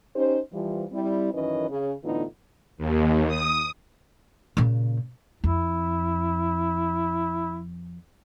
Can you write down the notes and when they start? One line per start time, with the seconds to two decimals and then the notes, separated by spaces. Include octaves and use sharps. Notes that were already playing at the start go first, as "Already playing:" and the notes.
0.15 C#4 D#4 G4 C5
0.53 E3 F3 G3
0.92 G3 C4 E4
1.33 F#2 D#3 E3 C#4 B4 D#5
1.69 C#3
2.03 A2 D3 E3 B3 D#4 F4
2.78 D#2
3.28 D#6
4.57 A#2 C#3
5.44 F2 E4